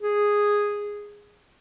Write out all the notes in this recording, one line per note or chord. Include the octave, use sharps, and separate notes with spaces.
G#4